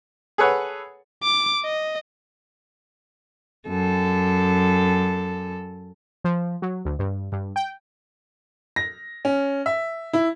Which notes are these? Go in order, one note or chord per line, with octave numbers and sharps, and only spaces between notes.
G#4 A4 B4 C#5 F#5
D6
D#5
F#2 A4
F3
F#3
D2
G2
G2
G5
A#6
C#4
E5
E4